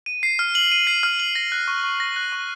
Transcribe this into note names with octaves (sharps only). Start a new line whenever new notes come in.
D#7
C7
F6
F#7
D#7
C7
F6
F#7
A#6
F#6
C#6
C#6
A#6
F#6
C#6